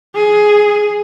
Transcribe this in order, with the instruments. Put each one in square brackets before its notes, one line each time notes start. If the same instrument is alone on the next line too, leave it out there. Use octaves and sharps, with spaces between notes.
[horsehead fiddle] G#4